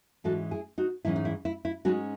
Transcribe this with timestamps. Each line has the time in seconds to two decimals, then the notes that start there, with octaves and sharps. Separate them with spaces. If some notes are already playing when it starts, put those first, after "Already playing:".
0.24 G#2 E3 G#3 C#4 F#4 A4
0.51 E4 G#4
0.78 D#4 F#4
1.05 G#2 E3 G#3 C#4 E4
1.16 D#4
1.25 E4
1.45 E4
1.65 E4
1.85 G#2 E3 G#3 C#4 D#4 F#4